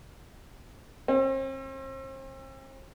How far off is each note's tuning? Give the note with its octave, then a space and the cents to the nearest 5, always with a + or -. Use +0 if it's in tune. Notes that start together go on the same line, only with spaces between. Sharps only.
C4 +40